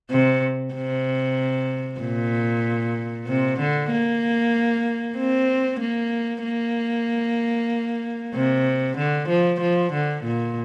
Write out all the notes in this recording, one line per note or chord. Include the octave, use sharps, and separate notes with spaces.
C3
C3
A#2
C3
D3
A#3
C4
A#3
A#3
C3
D3
F3
F3
D3
A#2